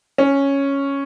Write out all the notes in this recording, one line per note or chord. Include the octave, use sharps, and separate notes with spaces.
C#4